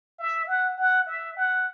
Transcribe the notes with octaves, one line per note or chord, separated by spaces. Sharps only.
E5
F#5
F#5
E5
F#5